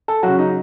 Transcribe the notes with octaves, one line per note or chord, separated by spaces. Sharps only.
A4
C#3 F#3 F#4
D#4